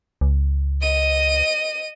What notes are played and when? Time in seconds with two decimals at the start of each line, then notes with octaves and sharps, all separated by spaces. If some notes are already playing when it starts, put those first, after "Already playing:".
0.21 C#2
0.82 D#5 D#7